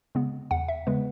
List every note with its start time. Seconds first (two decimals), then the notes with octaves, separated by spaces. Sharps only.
0.15 C#3 G#3 B3
0.51 E2 F#5
0.68 E5
0.87 C#3 G#3 B3 B4